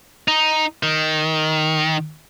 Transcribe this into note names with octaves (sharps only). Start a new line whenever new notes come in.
D#4
D#3